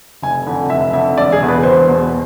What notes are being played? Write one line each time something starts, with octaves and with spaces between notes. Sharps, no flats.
F1 G#5
F2 D3
F1 E5
F2 D3 E5
E1 D5
G#4
E2 B2
B4
E1 C5
E2 B2